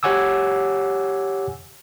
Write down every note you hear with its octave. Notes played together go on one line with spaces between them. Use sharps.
G4 C#5 F#5 G#5 D6 E6